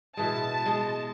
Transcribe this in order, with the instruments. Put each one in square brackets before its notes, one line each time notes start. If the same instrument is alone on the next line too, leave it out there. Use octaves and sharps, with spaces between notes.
[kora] B2 E3 G#3 [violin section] A5
[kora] G#3